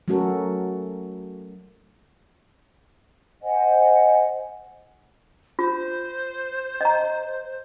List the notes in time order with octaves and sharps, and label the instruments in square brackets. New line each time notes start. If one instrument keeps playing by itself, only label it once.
[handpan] F#3 A3 C#4 F#4 A4 A#4
[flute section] C5 D#5 F#5 G#5
[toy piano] F4 [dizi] C5
[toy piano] D#5 A#5